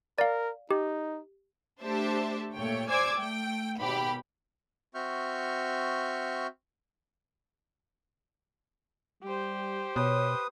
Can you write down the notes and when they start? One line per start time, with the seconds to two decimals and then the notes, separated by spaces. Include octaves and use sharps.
0.18 A#4 D5 F5
0.71 D#4 G4
1.82 A3 D4 G4 C5 E5 A5
2.56 A#2 A3 C#5 G5
2.89 C5 D5 G#5 D6 E6 G#6
3.19 A3 G5
3.80 G#1 B2 G4 B5
4.95 C4 F#4 E5 C#6 F6 G6
9.23 G3 G4 C5
9.96 B2 B4 C#5 D#6